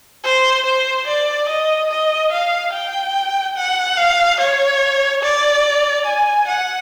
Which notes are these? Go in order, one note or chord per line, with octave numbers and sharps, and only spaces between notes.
C5
C5
D5
D#5
D#5
F5
G5
F#5
F5
C#5
D5
G#5
F#5